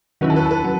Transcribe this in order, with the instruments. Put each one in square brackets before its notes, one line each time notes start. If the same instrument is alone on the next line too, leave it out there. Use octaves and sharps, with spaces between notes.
[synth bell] D#3 F#3 C#4 E4 [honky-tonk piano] B4
[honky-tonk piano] A4
B4
A4
B4
[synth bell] F#3